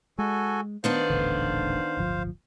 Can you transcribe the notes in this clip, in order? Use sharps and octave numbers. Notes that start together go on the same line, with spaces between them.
G#3 F#4 A4 G#5
D#3 B3 D4 C5 F5
D#1 A1 D3
D1 G1 F3